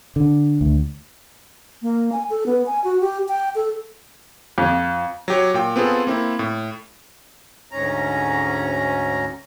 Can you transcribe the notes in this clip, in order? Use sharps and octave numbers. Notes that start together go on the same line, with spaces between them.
D3
D2
A#3
G#5
A4
B3
G#5
F#4
G4
G5
A4
F2
F#3 G4 C#5
A#2 G5
B3 C4 F4 G#4 A4
A#3 C4 E4
A2
D2 G#2 C#4 A#5